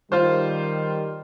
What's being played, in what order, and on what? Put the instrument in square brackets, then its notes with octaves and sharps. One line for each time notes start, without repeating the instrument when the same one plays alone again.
[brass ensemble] D#3 G3 [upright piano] F4 C5